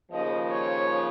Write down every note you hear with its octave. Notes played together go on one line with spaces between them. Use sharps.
D#2 C#3 F3 D#5
C#5